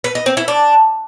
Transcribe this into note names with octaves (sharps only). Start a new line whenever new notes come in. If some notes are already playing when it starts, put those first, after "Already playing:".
B4
D#5
C4
E4
D4